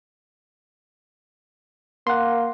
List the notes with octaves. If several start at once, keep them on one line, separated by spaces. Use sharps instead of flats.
A#3 F#5 C6